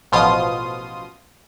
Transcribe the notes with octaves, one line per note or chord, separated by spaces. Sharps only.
A1 B2 F3 F4 C6 D#6